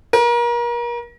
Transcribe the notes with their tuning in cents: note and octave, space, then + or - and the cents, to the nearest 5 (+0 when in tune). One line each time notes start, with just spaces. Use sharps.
A#4 +35